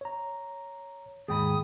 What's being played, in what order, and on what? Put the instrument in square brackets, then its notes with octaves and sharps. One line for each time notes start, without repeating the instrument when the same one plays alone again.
[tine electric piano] C#5 A#5
[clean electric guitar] D#2 G#2 [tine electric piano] G#4 G5 B5 [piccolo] D#6